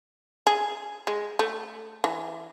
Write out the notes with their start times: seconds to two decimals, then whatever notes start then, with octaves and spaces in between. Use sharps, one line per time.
0.47 G#4
1.07 G#3
1.39 A3
2.04 E3